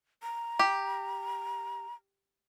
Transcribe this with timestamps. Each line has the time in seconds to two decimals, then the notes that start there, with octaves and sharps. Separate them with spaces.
0.23 A#5
0.59 G4